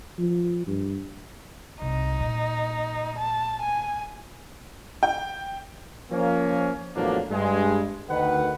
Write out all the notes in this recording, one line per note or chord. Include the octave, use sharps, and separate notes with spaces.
F3
G2
C2 D#4
A#2
A5
G#5
G5
F3 A#3 C#4
E2 A2 F3 F#3 A#3 D4
G2 G#3
D2 D#3 B4 F#5